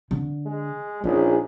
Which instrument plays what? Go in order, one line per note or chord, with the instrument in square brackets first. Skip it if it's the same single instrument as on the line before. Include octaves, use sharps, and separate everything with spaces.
[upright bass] D3
[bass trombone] G#3
[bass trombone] A#1 [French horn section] C#4 D#4 G#4 [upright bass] F4